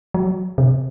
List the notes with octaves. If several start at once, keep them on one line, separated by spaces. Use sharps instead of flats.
F#3
C3